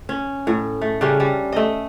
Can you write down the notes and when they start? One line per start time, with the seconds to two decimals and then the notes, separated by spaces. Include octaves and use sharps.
0.09 C#4
0.47 A2
0.81 A3
1.01 C#3 G3 C#4 D4
1.20 G3
1.52 A3 D#5